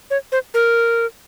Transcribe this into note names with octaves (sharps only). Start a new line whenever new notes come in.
C#5
C5
A#4